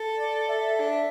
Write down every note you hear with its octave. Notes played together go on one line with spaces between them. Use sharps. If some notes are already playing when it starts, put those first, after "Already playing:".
Already playing: A4
D5
E5
D4